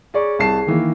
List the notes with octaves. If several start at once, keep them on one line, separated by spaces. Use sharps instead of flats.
G#4 C#5 D5
C2 A5 C7
D#3 E3 A#3